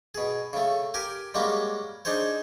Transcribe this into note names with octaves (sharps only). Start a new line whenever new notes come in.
B2 G#4
C#3 A3
G4 A#4 G#5
G3 G#3 A#3 C#4 F#4
D4 D#4 G#4 C5 C#5